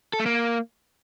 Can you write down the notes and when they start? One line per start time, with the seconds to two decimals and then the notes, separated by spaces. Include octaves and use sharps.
0.13 A4
0.20 A3
0.26 A#3